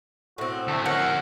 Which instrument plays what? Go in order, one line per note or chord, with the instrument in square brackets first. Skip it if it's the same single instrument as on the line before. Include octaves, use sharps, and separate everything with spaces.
[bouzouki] A2 C4 [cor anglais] F#4
[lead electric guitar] D2 [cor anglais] A3
[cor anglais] C#4 [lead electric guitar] A#4 C#5 [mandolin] F#5